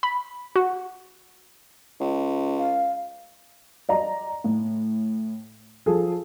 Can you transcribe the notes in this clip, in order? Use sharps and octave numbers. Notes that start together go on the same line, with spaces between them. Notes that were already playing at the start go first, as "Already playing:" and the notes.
B5
F#4
C#2
F5
D5 D#5 A#5
A2
F3 G#4 A4